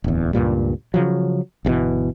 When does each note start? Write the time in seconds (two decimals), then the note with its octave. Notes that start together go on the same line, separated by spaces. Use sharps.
0.04 D1 E2
0.33 C#2 G2 A#2 G3
0.94 C#3 F3 F#3
1.65 G1 G2 B2 E3